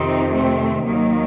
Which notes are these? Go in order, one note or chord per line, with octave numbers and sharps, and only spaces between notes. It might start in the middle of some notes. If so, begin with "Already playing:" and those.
Already playing: F2 C3 D#3 C4 D#4
A3 C4
D#2 D#3 F#3 A#3